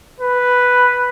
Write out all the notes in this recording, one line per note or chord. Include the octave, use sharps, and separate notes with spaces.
B4